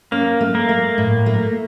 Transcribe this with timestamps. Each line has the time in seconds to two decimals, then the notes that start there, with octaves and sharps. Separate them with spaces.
0.12 A#3 C#4
0.41 A3
0.55 A#3
0.69 A3
0.98 A2
1.26 A3